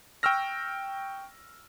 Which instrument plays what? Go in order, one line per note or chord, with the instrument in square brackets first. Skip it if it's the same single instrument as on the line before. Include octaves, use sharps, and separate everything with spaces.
[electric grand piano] G5 C#6 E6 F6 A#6